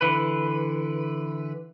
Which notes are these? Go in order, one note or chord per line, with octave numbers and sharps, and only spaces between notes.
D3 E3 B4